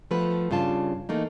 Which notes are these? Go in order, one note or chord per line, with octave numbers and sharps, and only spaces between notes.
F3 A3 B3 B4
G2 C#3 F4 A5
E3 A3 A#3 D#4